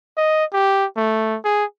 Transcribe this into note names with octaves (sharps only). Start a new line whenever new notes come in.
D#5
G4
A3
G#4